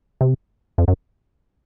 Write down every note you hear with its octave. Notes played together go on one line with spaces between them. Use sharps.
C3
F2
F#2